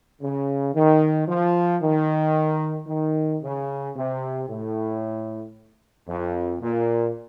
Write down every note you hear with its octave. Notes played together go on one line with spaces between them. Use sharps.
C#3
D#3
F3
D#3
D#3
C#3
C3
A2
F2
A#2